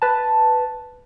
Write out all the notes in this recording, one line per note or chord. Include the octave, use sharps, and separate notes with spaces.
B4 A5